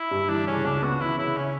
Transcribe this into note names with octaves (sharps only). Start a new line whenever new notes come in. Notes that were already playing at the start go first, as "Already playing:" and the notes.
Already playing: E4
G2
E3 D4
C#3 C#4
C#2 D4
B3 F#4
E3 E4
C#3 E4
C#4